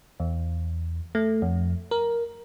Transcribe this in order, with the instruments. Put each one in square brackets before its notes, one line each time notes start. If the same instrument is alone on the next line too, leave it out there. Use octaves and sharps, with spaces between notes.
[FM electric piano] E2
A3
F2
A#4